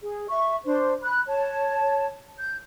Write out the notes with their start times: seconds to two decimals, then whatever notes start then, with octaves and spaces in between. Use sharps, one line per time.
0.02 G#4
0.29 E5 C#6
0.66 D4 C5
1.03 B5 F#6
1.27 C#5 A5
2.38 G6